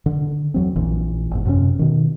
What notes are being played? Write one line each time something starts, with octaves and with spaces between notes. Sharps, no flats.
D3
E2 F#3 C4
A#1 A#2 E3
G#1 E2
F#2 C3 F3 C#4
B2 D#3